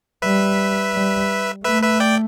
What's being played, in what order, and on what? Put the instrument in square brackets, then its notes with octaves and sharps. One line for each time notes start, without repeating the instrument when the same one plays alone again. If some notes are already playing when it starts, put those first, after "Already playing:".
[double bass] G3 [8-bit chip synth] B4 E5
[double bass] G3
[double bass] A3 [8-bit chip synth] B4 E5
[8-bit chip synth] B4 E5
D5 G5